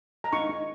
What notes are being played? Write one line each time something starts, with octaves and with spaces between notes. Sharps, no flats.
A#5
D#4 C#6
D#4